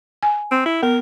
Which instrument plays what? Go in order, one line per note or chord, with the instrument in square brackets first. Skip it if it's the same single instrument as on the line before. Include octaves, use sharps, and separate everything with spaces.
[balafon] G#5
[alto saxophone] C4
E4
[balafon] B3 [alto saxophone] A#4